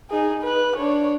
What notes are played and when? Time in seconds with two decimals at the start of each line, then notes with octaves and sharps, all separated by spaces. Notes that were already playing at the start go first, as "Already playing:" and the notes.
0.11 D#4 G#4
0.43 B4 F#6
0.77 D4 C#5